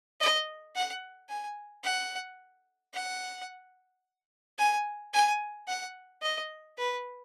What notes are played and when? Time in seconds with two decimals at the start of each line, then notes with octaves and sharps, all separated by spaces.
0.21 D#5
0.75 F#5
1.29 G#5
1.84 F#5
2.94 F#5
4.59 G#5
5.14 G#5
5.68 F#5
6.23 D#5
6.78 B4